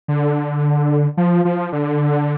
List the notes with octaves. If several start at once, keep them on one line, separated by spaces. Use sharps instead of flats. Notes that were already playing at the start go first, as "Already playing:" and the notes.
D3
F3
F3
D3